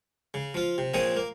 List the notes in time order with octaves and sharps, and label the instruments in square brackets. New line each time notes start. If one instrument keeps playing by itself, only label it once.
[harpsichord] C#3
F3 F4
C3
A#2 F3 C4 G#4 C#5 D#6
A#3